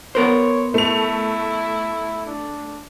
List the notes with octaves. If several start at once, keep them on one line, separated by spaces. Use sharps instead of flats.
B3 A#4 C5 C#5
A3 E4 F7
D4